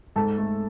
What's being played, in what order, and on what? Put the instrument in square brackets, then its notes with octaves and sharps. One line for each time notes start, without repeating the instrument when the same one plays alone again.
[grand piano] G#2 A4 A5
A3